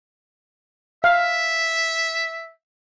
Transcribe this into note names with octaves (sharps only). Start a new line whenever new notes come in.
E5 F5